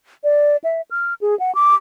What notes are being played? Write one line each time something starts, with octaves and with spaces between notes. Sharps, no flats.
D5
E5
F6
G#4
F#5
D6